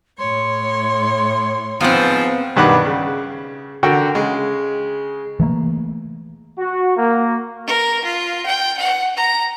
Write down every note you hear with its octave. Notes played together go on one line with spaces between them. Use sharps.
A2 C#5 C6
G#2 F3 B3 C4
B1 G2 D#3 B4 F#5 D6
C#3
D3 F#4 A4 A#4 G5
C#3 G#3
E3 A3 A#3
F#4
A#3
A#4
F4
G5
F#5
A#5